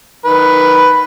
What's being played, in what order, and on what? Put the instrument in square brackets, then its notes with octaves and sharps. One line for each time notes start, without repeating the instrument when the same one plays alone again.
[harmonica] D#3 B4